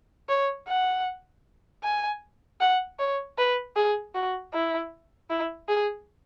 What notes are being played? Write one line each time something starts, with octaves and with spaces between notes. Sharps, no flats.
C#5
F#5
G#5
F#5
C#5
B4
G#4
F#4
E4
E4
G#4